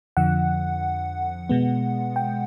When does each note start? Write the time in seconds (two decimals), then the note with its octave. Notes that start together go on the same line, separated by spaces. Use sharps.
0.17 F2 D3 F3 F#5
1.49 B2 G#3 B3
2.16 G5